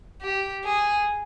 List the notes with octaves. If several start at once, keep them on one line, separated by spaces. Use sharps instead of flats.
G4
G#4